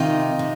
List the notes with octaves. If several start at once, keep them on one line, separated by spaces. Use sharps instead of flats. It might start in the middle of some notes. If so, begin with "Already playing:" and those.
Already playing: C3 D#3 D#4 F4
C3